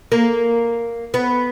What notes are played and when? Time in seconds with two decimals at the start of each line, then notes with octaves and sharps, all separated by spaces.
0.12 A#3
1.14 B3